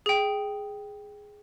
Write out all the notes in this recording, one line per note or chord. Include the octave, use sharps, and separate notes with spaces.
G#4 G5